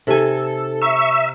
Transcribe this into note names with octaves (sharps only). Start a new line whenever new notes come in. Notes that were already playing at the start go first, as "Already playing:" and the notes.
C3 D#4 G4 A4 G#5
E5 A#5 C#6